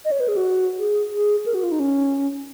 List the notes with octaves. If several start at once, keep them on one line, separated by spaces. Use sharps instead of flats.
D#5
C#5
B4
G#4
F#4
G#4
G#4
A#4
F#4
F4
D#4
C#4